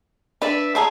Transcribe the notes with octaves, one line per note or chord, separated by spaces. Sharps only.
D4 B4 D5 E5
G#4 D5 E5 A5 A#5 C6